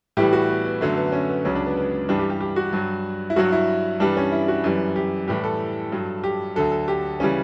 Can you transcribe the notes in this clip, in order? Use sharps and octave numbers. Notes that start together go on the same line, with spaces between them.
A2 E3 G3 G4
F#4
B3
B3
F#2 D3 F#3 A3
B3
C#4
B3
C#2 C#3 F#3 C#4
D4
B3
B3
G2 E3 G3 D4
G4
G4
G4
F#4
G2 F#3
E4
G2 F#3 F#4
E4
G2 E3 G3 D4
C#4
E4
F#4
F#2 E3 G3
G4
A2 E3 G3 G4
A4
G2 F#3
G4
D2 D3 F#3 A4
A4
G4
C#3 E3 G3 C#4